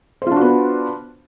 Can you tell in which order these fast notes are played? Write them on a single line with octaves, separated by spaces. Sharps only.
C5 F4 D4 F#4 B3